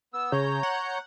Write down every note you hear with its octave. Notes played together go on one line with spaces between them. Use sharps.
B3 E6
C#3 C#5 A#5 G6
F#5